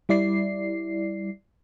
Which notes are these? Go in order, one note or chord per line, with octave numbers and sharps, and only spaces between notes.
G3 E4 D5 C7